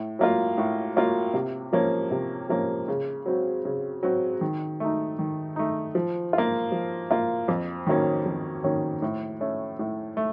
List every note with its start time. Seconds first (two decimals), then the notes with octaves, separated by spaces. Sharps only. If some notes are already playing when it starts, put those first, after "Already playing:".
Already playing: A2
0.19 F#3 A#3 F4
0.58 A2
0.96 F#3 A#3 F4
1.34 C3
1.73 F3 A#3 C#4
2.11 C3
2.49 F3 A#3 C#4
2.88 C#3
3.26 F#3 C4 F#4
3.65 C#3
4.03 F#3 C4 F#4
4.41 D#3
4.80 A3 D#4
5.19 D#3
5.56 A3 D#4
5.95 F3
6.33 F4
6.38 A#3
6.72 F3
7.11 A#3 F4
7.48 F2
7.87 D#3 F#3 A#3 C#4
8.26 F2
8.64 D#3 F#3 A#3 C#4
9.02 A2
9.41 A3 C#4
9.79 A2
10.17 A3